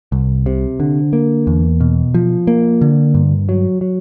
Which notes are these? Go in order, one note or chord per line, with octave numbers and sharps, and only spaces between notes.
C2
C3
D3
A#3
E2
B2
F3
A#3
D3
G2
F#3
F#3